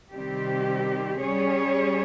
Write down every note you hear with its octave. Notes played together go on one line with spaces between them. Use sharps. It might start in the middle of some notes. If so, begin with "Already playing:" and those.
C3 D#3 G3 C4 G4
G3 C#4 G#4 C#5